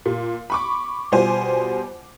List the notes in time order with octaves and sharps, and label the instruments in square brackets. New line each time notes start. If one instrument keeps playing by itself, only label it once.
[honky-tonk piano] A#2
B5 C#6 D6
B2 G3 F4 C5 G#5